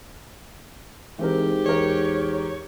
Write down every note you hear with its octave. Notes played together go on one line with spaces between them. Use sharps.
G#2 E3 C4 G4 A#4
E2 A#4 C#5